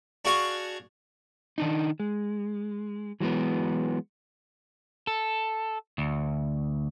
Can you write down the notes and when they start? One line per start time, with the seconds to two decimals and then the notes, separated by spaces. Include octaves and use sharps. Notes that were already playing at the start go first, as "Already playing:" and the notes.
0.25 D4 F#4 G#4 F5 C#6
1.58 D#3 D4 D#4
2.00 G#3
3.20 E3 F#3 G#3 B3
5.07 A4
5.98 D2